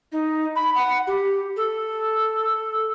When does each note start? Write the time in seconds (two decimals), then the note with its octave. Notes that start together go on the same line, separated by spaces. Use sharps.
0.12 D#4
0.56 B5
0.75 F#5
1.07 G4
1.56 A4